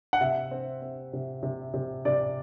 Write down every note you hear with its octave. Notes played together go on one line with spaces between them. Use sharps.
F#5
C3 E5
C4
C4
C3
C3
C3
C3 D5